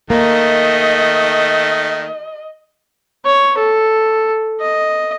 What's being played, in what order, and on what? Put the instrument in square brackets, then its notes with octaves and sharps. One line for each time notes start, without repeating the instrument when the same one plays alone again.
[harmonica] D#3 A3 [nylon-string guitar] A#3 [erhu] D#5
[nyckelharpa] C#5
A4
D#5